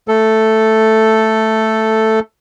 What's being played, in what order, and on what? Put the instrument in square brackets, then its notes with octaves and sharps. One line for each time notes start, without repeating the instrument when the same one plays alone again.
[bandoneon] A3 A4